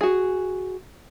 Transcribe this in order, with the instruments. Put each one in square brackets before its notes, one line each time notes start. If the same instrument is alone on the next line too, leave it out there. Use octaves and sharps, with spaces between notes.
[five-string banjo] F#4 G#4